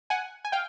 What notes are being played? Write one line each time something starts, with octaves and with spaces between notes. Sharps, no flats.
F#5 G#5
G#5
F5 G5